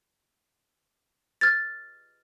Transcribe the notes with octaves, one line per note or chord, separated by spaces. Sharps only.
F6 G#6 A6